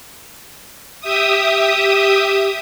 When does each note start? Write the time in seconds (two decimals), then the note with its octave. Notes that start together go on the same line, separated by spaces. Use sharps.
1.01 G4 E5 D#6